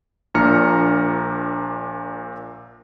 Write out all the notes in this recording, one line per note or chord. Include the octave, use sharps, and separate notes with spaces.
A#1 A#2 D4 A#5 F6 C#7